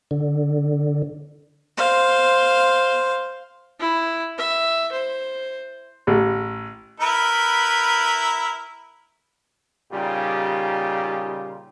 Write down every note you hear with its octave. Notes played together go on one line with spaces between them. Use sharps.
D3
C5 F5
E4
E5
C5
A1
E4 A#4 B4
A#2 C#3 G3 D#4 F4 G4